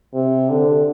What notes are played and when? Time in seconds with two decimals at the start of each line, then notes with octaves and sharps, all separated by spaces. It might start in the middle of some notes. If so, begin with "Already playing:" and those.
0.14 C3
0.50 D3